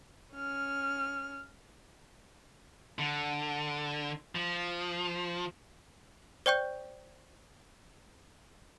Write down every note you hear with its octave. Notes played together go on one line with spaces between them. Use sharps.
C#4 F6
D3
F3
C5 D5 G5 C#6 G6